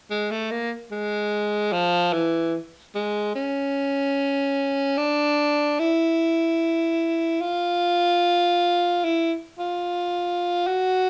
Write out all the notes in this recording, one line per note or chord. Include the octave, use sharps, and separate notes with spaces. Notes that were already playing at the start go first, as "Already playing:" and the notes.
G#3
A3
A#3
G#3
F3
E3
G#3
C#4
D4
E4
F4
E4
F4
F#4